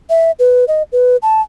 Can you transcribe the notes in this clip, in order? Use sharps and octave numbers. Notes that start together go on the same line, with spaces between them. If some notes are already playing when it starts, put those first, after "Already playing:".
E5
B4
D#5
B4
A5